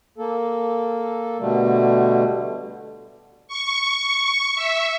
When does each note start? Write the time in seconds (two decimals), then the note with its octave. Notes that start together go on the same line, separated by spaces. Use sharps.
0.18 A#3 A4
1.39 B2 D3 G3 A3
3.48 C#6
4.55 E5